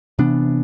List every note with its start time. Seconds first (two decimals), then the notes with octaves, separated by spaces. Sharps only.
0.19 C3 E3 B3 D4